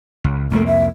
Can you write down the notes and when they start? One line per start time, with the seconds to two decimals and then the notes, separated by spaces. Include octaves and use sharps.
0.24 C#2
0.51 C2 F2 A3 A#3
0.67 E5